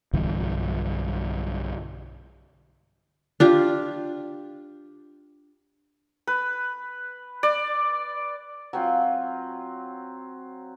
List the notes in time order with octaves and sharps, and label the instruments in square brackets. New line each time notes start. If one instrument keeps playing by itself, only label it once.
[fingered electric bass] B1 G2 D3 E3
[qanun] D4 F4 G4
[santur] B4
D5
[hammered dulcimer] F#3 C4 F4